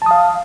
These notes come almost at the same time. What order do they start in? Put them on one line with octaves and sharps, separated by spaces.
A5 D#6 F5